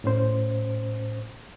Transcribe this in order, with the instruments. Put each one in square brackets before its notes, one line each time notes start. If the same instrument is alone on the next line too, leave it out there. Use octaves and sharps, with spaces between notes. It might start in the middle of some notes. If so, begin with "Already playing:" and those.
[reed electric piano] A2 C#4 C5